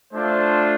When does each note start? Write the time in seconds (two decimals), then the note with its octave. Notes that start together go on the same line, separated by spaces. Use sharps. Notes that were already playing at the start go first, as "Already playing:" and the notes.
0.12 A3 D4 F4 C5